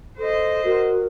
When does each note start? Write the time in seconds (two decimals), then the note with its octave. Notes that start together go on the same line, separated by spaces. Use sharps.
0.18 A4 C5 D#5
0.64 F#4 A#4